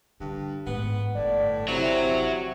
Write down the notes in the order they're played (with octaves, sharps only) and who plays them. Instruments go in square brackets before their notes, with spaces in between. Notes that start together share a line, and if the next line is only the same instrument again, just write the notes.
[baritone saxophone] G2 [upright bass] D3
[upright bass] G#2 [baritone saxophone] B3
[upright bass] G1 [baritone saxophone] A2 [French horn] D5
[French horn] C3 [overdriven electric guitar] F#3 [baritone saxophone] E4